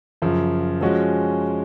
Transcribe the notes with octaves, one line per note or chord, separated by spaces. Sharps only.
F#2 C#3 F3
F3 G#3 C#4 F#4